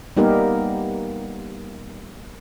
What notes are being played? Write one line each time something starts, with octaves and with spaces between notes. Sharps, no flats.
G3 A#3 B3 D#4 G4 A#4